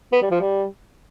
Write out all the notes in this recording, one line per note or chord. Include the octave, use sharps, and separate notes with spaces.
B3
G3
F3
G3